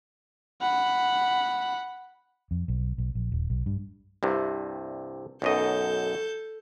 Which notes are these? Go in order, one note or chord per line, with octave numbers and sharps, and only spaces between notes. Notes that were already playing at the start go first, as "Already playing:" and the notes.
F#5 B5
F2
B1
B1
A#1
D#1
B1
G2
C2 G2 C3
B1 F#2 A4 D#5 G6